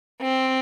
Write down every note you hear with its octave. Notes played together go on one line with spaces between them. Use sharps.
C4